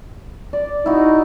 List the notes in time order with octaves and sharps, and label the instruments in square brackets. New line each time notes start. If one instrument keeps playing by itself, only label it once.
[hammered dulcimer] D5
[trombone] D#4 [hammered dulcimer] E4 F#4